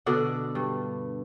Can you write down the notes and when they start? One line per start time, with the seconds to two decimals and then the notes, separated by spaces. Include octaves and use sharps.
0.06 B2 D3 D4 F#5
0.55 G2